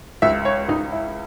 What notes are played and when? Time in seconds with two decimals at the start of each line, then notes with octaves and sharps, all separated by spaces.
0.22 C#2 E5
0.45 C#5
0.68 C#2 D#4
0.92 E4